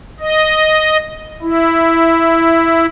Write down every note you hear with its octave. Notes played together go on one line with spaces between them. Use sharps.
D#5
E4